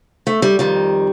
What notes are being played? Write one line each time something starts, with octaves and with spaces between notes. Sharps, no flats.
A3
G3
F2 D#3 G3